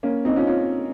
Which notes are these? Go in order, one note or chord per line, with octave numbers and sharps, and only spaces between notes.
A#3 C#4
C4 D#4
C#4 F4
C#4 F4